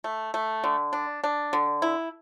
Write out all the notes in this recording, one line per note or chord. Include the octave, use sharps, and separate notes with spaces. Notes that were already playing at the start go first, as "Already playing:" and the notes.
A3
A3
D3
D4
D4
D3
E4